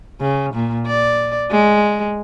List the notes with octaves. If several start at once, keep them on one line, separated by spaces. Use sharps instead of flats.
C#3
A#2
D5
G#3